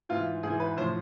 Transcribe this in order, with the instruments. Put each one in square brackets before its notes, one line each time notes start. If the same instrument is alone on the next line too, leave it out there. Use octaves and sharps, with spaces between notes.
[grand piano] G#2 E3 F4
G#2 E3 G#4
B4
A2 F3 C5